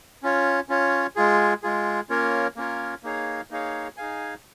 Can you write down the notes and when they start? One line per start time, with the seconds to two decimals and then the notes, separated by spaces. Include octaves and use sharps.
0.23 C#4 F4 C#5
0.69 C#4 F4 C#5
1.16 G#3 F4 G#4
1.63 G#3 F4 G#4
2.09 A#3 C#4 F4 A#4 C#5
2.56 A#3 C#4 F4 A#4 C#5
3.04 A#3 D#4 G#4 C#5 F5
3.51 A#3 D#4 G#4 C#5 F5
3.97 D#4 G#4 F5 G#5